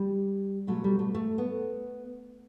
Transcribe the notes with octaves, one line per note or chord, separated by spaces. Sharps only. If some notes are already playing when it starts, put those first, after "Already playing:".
Already playing: G3
B2 F#3 A3
G3
A3
A3
B3